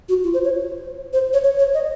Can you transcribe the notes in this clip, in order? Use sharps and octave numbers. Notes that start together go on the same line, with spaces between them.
F#4
F4
C5
C#5
C5
C#5
C#5
C#5
D#5